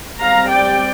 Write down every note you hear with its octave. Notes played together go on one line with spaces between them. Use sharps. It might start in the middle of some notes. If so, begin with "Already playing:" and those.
G3 C4 F5 A#5
D5 G5